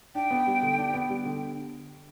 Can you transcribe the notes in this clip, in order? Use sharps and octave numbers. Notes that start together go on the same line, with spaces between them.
D4 G5
B3
G3
D3
D4
B3
G3
D3